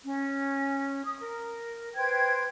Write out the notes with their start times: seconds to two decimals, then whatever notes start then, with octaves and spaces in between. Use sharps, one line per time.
0.04 C#4
1.05 D#6
1.20 A#4
1.96 B4 C5 G5 G#6